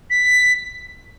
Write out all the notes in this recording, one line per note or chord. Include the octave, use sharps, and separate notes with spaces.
B6